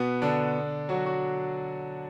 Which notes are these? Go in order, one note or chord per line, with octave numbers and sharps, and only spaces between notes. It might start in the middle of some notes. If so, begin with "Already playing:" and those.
Already playing: B2 B3
D3 D4
F#3 F#4
F#3 F#4